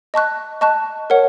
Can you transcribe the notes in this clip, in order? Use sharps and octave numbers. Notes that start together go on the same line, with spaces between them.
D#5 A5 C#6 F#6
D#5 A5 C#6 F#6
A#4 C#5 F#5